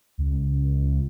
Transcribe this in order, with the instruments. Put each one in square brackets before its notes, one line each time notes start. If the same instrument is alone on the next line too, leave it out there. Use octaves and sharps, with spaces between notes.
[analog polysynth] C#2